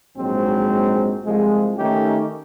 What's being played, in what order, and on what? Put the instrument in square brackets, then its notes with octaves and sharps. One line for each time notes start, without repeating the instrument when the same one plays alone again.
[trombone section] A#1 G#2 F#3 G#3 C4
C2 F3 G#3
D#3 A3 C#4 D#4 G4